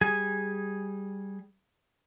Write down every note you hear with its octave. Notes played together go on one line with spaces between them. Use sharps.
G3 G#4 G#5